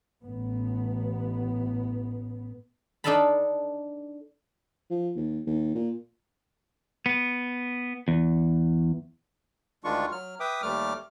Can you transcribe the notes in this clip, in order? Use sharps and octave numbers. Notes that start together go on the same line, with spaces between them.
A1 B3
D4 D#4 A4 F5 A5 B5
F3
D#2
D#2
A#2
B3
E2
D2 D#3 G#3 D4 F4 C#6
F#3 F6
B4 E5 G5 D6 D#6
D#2 G3 A3 D6 F6